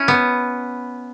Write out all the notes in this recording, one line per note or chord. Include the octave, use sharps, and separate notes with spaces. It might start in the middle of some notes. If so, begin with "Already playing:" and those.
Already playing: C#4 E4
B3